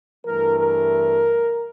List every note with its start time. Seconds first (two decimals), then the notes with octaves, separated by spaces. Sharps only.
0.25 G2 E3 A3 A#4
0.59 A#4